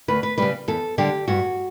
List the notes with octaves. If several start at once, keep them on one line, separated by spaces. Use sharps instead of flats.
D2 B4
B4
C#3 G3 B4
E2 A4
D3 G3 G4
G2 F#4